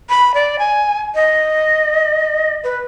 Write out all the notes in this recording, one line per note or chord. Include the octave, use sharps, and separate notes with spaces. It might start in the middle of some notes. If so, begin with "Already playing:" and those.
B5
D5
G#5
D#5
B4